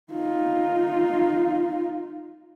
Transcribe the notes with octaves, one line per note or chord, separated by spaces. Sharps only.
D#4 F4